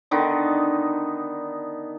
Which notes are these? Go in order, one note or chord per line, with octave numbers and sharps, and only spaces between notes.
D3 D#3 B3 D#4